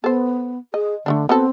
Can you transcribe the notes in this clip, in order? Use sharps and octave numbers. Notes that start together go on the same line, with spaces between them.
B3 A4 C5
G#4 D#5
D3 A3 B3 D4
B3 C4 F#4 A4